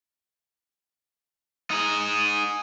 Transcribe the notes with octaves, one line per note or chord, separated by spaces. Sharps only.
D#4 G#4